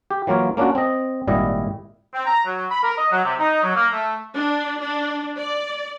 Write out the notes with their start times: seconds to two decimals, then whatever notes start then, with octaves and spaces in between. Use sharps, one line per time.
0.11 G4
0.27 E3 F#3 A#3 F4 C#5
0.57 A#3 C#4 D4 F4 F#4
0.75 C4 D#5
1.27 G#1 A#2 G3 E4 D#5
2.14 C4
2.25 A#5
2.46 F#3
2.71 B5
2.83 A#4
2.98 D#5
3.11 F#3
3.24 C3
3.39 D#4
3.63 F#3
3.76 A#3
3.92 A3
4.34 D4
4.81 D4
5.38 D5